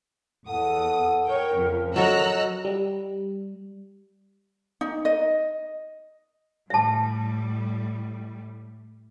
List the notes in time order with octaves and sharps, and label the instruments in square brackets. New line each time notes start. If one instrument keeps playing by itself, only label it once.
[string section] E2 D#6 [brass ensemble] A4 F#5
[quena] A#4 [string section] C#5 G5
[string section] F2 [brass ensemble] C#3 F3
[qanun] F#3 A4 A#4 [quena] D#5 [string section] A#5 E6 F#6
[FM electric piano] G3
[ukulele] D#4
D#5
[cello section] A2 G3 [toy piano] E5 A5